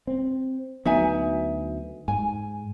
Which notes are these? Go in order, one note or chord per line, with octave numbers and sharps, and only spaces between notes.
C4
D2 F#3 B3 D#4 E5 G#5
G#2 G#5